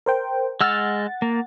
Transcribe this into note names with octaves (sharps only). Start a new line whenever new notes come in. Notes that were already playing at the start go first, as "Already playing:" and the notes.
A#4 C5 G5
G#3 F#5 E6 F6 A6
A#3